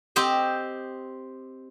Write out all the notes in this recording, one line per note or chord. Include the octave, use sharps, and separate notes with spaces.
C4 G4 C5 D#5